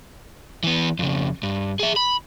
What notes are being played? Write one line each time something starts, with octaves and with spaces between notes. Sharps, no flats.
E3 B3
F2 C#3
G2
G#4 E5
B5